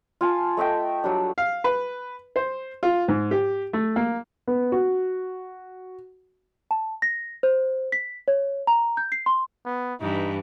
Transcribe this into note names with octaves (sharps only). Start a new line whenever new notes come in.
F4 G#5 A5
A3 D#5 E5 G5
F#3 G3 D4
F5
B4
C5
F4
G#2
G4
A3
A#3
B3
F#4
A5
A#6
C5
B6
C#5
A#5
G6
C7
C6
B3
G2 E3 D#4